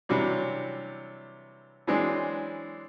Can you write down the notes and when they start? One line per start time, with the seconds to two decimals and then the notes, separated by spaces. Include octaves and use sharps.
0.09 C3 E3 F#3 G3 D4
1.87 E3 F#3 G#3 C4 D4